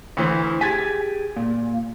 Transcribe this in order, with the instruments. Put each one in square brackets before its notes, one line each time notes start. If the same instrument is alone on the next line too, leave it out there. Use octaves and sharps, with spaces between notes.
[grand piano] D2 E3 C5
[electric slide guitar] G4 G#4 G#5 [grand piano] G#6 A6 B6
[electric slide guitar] A#2